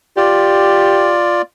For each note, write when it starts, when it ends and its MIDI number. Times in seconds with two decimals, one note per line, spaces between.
0.17 1.42 65
0.17 1.16 67
0.17 1.42 74